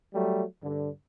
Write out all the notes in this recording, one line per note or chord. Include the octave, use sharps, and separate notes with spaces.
F#3 G3 A3
G2 D3